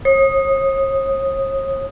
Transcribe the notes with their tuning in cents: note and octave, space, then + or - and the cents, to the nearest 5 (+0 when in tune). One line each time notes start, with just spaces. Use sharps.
C#5 -45 D#6 +0